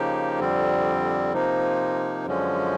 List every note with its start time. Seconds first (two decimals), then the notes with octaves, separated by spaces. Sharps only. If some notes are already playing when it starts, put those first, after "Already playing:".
Already playing: C#3 F3 A#3 D#4 G4
0.39 F2 D3 G3 C4
1.33 C3 F3 A#3 D#4
2.26 F#2 D3 F3 G#3 C#4